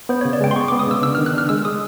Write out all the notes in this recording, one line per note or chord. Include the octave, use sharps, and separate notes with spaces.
B3 C5
C#5
C#3
D5
G#3 G5
C6
B3 C#6
D6
B3
D#6
C#3 E6
D4 E6
F6
D#3
F#6
D4 F6
G#3 E6
G#3 D#6